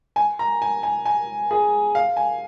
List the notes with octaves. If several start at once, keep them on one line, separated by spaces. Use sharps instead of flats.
G#5
A#5
G#5
G#5
G#5
G#4
F5
G#5